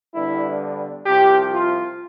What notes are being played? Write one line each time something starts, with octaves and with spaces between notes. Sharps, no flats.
G2 D3 G3 B3 E4
C2 C3 F3 G4
F4